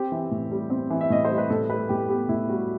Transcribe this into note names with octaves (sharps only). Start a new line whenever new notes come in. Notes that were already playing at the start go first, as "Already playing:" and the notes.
Already playing: C4 G4
E3
A2
G3
C4
E3
E5
A2 D#5
C5
G3
B4
A2 A4
G3 B4
A2 G4
B3 G4
A2 E4
G3 F#4